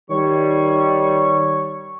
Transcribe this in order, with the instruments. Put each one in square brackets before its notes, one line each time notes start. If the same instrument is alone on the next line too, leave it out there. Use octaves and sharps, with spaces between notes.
[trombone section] D#3 G3 [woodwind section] C#5 C#6